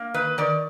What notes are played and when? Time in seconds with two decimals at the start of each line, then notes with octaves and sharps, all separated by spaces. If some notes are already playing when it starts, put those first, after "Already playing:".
Already playing: A#3
0.14 D#3 B4
0.38 D#3 D5